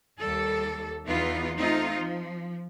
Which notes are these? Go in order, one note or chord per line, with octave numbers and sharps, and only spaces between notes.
D#2 G3 A4
E2 E3 B3 D#4 F4
A3 C4 D#4 F4
F3